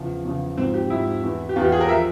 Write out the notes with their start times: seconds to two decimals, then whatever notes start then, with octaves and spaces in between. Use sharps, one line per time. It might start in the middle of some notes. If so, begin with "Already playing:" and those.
Already playing: E2 C#3 F3
0.25 E2 C#3 F3
0.57 G#2 F3 C4
0.74 G4
0.90 G#2 F3 E4
1.23 E2 E3
1.49 G4
1.56 E2 E3 F4
1.64 G4
1.72 G#4
1.81 A#4
1.89 F3 E5